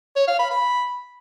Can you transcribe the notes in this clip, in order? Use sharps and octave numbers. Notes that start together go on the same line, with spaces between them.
C#5
F5
B5
B5